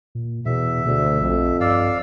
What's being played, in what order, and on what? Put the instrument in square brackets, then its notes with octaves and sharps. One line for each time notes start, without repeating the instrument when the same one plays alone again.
[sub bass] A#2
[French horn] E2 [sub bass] B2 [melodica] E5
[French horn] D2 [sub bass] B2
[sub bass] A#1 [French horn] F2
[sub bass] G2 [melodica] D5 F5 E6